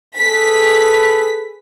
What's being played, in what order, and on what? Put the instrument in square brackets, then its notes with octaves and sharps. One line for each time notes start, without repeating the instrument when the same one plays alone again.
[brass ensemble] G#4 A4 B4 [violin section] B6